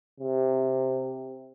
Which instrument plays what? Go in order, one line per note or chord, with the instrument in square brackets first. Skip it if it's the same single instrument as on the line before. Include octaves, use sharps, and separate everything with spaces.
[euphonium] C3